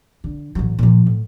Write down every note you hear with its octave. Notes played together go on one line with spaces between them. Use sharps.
D3
A1 F#3
A#2 F3
A2